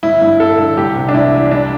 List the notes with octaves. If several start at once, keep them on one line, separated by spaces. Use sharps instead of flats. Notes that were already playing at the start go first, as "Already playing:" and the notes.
G1 E4
G2
G1 A4
D3
C2 G4
C3
D4
C2 E4
E3
C2 D4